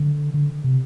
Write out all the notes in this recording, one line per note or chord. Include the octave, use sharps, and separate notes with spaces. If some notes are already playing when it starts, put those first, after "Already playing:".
Already playing: D3
D3
C3